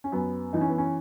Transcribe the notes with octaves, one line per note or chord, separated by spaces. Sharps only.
C#4
F#2 B3
E3 D#4
C#4
B3
C#4